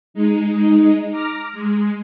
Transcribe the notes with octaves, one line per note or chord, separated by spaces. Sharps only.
G#3 D#4
A#5 D6 F6 A#6
G#3